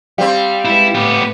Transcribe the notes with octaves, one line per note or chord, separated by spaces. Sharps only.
G3 C4 F5
G#3 E4 B4
A2 B3 G4 B4